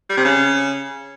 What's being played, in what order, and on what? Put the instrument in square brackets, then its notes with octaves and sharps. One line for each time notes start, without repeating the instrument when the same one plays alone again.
[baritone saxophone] G3
C3
C#3